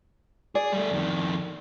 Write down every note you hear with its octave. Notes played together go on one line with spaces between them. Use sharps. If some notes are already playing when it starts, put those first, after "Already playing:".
G#4 D5
G3 A3
F2 D#3